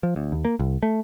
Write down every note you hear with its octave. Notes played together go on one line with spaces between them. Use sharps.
F3
D2
D#2
A#3
C2
A3